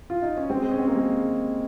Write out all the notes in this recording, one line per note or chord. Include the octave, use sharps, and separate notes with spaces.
F4
D#4
C#4
G#3 C4
C#4
C4
A#3
G#3